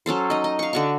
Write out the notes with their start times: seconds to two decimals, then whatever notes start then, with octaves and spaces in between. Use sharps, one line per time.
0.06 F#3 C#4 A4 C5
0.30 D#4 D#5
0.44 D#5
0.59 F5 C#6
0.73 D3 F#4 C#6